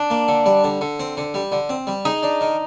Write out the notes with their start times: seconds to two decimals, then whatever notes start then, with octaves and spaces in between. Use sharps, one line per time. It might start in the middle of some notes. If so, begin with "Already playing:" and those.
Already playing: D4
0.10 A#3
0.28 D3
0.46 G3
0.64 D3
0.81 D3
1.00 C4
1.17 D3
1.34 G3
1.52 D3
1.69 C4
1.87 G3
2.05 D#4 G#4
2.23 D4
2.41 D#3